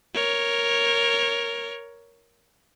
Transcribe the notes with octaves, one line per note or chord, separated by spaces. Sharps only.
A#4 C#5